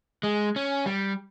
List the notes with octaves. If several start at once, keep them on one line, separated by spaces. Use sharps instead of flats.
G#3
C#4
G3